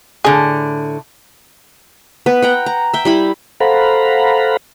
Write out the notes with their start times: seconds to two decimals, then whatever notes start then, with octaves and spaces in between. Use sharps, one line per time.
0.25 A2 D3 G#4
2.26 B3 B4
2.42 F#5 G5 A#5
2.66 A#5
2.93 E5 G5
3.05 G3 E4 B5
3.60 A4 C5 F5 F#5 A#5 B5